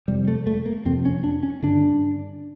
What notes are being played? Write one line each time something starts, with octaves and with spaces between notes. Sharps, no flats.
F2 C3 G3
A3
A3
A#3
F2 C3 C4
C#4
D4
C#4
G2 D3 D4